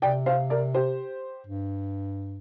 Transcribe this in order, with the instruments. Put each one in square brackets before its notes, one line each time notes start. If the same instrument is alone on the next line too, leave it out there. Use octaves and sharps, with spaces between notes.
[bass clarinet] C3 [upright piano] D5 G5
[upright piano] C5 F5
A#4 D5
G4 C5
[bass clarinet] G2